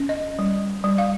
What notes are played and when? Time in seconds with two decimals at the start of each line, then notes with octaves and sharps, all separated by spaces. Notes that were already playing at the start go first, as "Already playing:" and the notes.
Already playing: C#4
0.09 D#5
0.39 G3
0.84 G3
0.98 F5